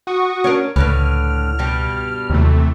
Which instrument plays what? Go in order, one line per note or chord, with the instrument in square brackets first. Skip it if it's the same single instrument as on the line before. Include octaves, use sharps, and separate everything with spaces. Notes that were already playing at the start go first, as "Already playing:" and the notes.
[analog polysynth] F#4 C#6 D#6
[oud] C#4 D4 A#4
[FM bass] C#2 [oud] A2 D3 B4 [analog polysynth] F6
[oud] G2 B2 G3
[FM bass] D#2 [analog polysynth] C3 E3 A3